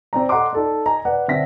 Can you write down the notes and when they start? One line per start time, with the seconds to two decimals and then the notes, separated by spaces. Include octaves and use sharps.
0.13 C4 D5 A#5
0.29 A4 D#5 F#5 A#5 C6 D6
0.53 D#4 A4 D5
0.85 D#5 G#5 A#5
1.05 B4 D5 F#5
1.28 D3 C4 E5 A#6 B6